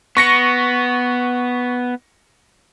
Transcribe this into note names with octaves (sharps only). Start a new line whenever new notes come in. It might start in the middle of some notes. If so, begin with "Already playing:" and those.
B3 C#6 A#6 C#7